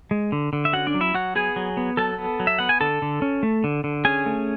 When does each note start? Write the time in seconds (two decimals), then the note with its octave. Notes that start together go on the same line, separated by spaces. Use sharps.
0.11 G#3
0.32 D3
0.53 D3
0.65 E5
0.73 C#4 F#4 F#5
0.87 D4 D5
0.94 F#3
1.01 E4 E5
1.14 F#3 F#4 F#5
1.35 B3 G#4 G#5
1.56 F#3
1.77 B3
1.97 F#3 A4 A5
2.18 B3
2.40 F#3
2.47 E5
2.59 B3 F#5
2.69 G#5
2.81 D3 A4 A5
3.02 D3
3.22 C#4
3.43 A3
3.64 D3
3.84 D3
4.05 C#4 G#4 G#5
4.26 A3